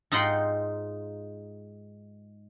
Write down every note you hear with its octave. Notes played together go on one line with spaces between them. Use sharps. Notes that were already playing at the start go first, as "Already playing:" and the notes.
G#2 D#4 F4 F#5 G5 C6